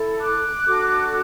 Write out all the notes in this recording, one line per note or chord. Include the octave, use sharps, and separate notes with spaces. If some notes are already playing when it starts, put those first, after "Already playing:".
Already playing: E4 A4
D6 F#6
D4 F#4 A4